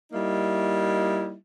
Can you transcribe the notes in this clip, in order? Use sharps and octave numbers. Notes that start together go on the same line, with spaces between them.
G3 A#3 D#4 E4